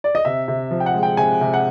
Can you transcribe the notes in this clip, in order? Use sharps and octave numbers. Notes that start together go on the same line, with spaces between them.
D5
D#5
C3 E5
C3
F3
G5
F#5
G#3
G5
C3 G#5
C3
F#5